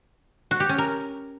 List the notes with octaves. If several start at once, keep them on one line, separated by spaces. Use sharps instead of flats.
F#4
G4
C#4
A#4